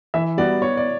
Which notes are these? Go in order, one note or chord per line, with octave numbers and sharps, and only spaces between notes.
E3 E5
G3 B3 F#4 D5
B3 C#5
D5